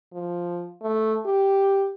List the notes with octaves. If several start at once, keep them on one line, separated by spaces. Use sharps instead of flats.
F3
A3
G4